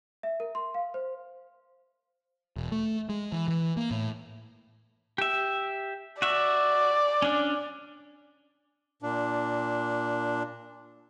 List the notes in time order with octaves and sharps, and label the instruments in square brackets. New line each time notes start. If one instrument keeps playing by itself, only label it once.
[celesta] E5
A#4
C6
F5
C5
[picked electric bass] E1
A3
G#3
E3
E3
A#3
A2
[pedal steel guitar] G4 E5
[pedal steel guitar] F#4 E5 [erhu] D5
[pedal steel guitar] C#4 D4
[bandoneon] A#2 D4